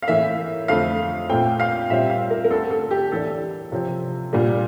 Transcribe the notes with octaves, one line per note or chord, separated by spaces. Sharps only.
F5
A2 E3 A#3 E5
F2 D3 A3 F5
A#2 A3 C4 G5
F5
A#2 G3 C4 E5
F5
A#4
A#4
D2 D3 A3 A4
A4
G4
A2 E3 A#3 D4 A4
C3 F3 C4
A#2 G3 A#3 D4